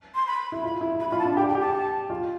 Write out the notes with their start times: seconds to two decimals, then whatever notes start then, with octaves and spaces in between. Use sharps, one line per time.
0.15 C6
0.27 B5
0.52 E4
0.63 F4 B5
0.81 E4
1.00 E4 B5
1.10 F4 B5
1.19 A5
1.25 D4
1.37 G4 G5
1.49 G5
1.55 G4
1.61 A5
2.10 F4